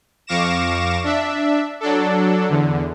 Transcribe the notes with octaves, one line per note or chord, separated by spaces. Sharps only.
F2 F5 C#6 D6 A#6 E7
D4 E5
F#3 D4 A4
E2 D3